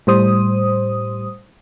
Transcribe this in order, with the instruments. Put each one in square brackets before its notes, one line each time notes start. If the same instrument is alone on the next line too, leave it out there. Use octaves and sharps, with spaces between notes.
[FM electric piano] A2 G3 C5 D#6